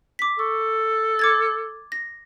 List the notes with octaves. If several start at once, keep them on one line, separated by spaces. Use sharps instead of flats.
D6 B6
A4 C#6
D6 G#6 A6
A#6